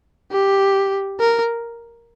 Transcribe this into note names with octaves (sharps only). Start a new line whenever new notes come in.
G4
A#4